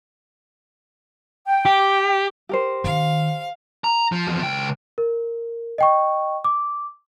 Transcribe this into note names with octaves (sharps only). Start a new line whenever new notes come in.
G5
G4
G4 A#4 C5
D#3 F5
A#5
F3
E2 F3
C#2 G5
A#4
D#5 G5 C#6
D6